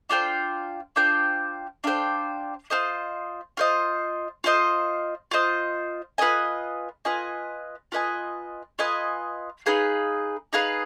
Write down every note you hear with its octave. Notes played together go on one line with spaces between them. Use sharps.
D4 F4 C5 G5
D4 F4 C5 G5
D4 F4 C5 G5
F4 C5 D#5
F4 C5 D#5
F4 C5 D#5
F4 C5 D#5
F4 B4 D#5 G#5
F4 B4 D#5 G#5
F4 B4 D#5 G#5
F4 B4 D#5 G#5
D#4 G#4 B4 F5
D#4 G#4 B4 F5